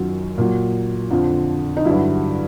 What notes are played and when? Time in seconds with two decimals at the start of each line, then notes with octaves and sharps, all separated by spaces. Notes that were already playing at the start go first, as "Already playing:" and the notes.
Already playing: F#2 D#3 F#3 F4
0.38 A#2 F#3
1.10 F2 D3 F3
1.77 D#4
1.85 G2 D3 F#3 E4